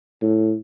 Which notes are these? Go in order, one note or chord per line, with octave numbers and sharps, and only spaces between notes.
A2